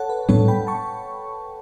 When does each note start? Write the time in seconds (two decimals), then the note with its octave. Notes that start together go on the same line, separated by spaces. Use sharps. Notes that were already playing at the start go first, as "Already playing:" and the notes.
Already playing: A4 C#5 F#5 A5
0.09 B4
0.29 A2 G3 B3 D4 A4 C#5
0.48 G5 B5
0.67 A5 C#6